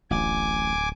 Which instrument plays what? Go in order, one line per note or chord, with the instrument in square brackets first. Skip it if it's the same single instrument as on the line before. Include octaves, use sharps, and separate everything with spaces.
[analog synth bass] D1 [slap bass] A1 D2 [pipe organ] G#5 D6